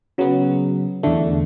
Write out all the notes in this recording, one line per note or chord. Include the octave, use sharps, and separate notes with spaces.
C#3 F#3 B3
E2 D3 A3